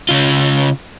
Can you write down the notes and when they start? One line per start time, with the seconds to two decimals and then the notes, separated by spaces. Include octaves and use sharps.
0.09 C#3 F4